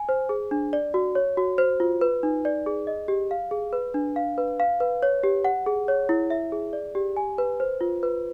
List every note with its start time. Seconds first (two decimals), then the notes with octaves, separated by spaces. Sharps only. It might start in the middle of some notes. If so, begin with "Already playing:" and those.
Already playing: G#5
0.09 C5
0.29 G#4
0.51 D4
0.73 D5
0.94 F#4
1.15 C#5
1.37 F#4
1.58 C5
1.80 F4
2.01 B4
2.23 D#4
2.45 D5
2.66 G#4
2.87 D#5
3.08 G4
3.31 F5
3.51 G#4
3.73 B4
3.94 D4
4.16 F5
4.38 B4
4.60 F5
4.80 B4
5.03 C#5
5.23 G4
5.45 F#5
5.66 G#4
5.88 C#5
6.09 E4
6.30 E5
6.52 G#4
6.73 D5
6.95 G4
7.17 G#5
7.38 B4
7.60 C5
7.81 F4
8.03 B4